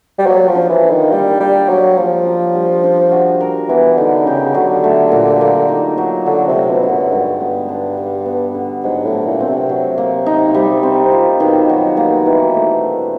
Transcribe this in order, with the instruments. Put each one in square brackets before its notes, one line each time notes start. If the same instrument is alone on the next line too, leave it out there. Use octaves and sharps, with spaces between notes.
[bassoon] G3
[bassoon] F#3 [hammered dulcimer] A#3
[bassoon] F3
[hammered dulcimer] D4
[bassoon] E3
[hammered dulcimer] F4
[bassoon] D#3
[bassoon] G3 [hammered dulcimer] A#3
[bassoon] G3 [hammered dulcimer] D4
[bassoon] F#3 [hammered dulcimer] G3
[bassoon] F3 [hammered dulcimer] A#3
[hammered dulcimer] D4
G3
D4
F#4
A#4
[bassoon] E3 [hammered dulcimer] B3
[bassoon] D3 [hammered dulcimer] D#4
[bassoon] C#3 [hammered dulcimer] G4
[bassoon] D3 [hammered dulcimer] F#3
[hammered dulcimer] A3
A#2
A#3
D#4
F#3
[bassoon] D3 [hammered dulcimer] F#3
[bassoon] C3
[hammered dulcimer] A3
[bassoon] B2
[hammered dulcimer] D3
[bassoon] F#2
[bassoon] G2 [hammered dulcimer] G#3
[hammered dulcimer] B3
D4
G3
B3
D3
[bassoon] G#2 [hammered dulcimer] F#3
[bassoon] A2
[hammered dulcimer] A3
[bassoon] A#2
[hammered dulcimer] C4
[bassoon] C3
[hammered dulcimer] F#3
A#3
D#4
G3
C4
F4
[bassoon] B2 [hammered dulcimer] D#3
[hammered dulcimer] F#3
A#3
E3
A3
D4